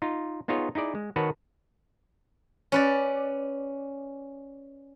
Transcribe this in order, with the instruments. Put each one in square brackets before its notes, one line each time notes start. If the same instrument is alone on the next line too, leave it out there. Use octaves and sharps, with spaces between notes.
[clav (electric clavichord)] D#4 F4
B3 D#4 F4 G#4 C#5
D#4 E4 G#4 D5
G#3
D#3 F#4 B4 C#5 A5
[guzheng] C#4 B4 D5